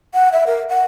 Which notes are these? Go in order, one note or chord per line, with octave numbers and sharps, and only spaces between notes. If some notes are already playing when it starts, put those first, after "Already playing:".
F#5
E5
A#4
F#5